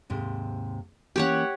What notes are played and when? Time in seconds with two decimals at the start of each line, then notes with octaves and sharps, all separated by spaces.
0.10 D#2 G#2 C3
1.16 E3 A#3 C#4 G4 C#5 F#5